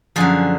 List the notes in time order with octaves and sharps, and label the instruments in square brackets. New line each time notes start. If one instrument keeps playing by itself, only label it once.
[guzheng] F#2 D3 F3 G#4